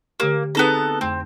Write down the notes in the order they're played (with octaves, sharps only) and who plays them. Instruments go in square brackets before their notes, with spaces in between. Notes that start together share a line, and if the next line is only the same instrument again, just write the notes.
[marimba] D3 A3 G4 [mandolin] A#3
[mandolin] B3 A4 A#5 [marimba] C4 D#4 G#4
[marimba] F2 A3 [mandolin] C4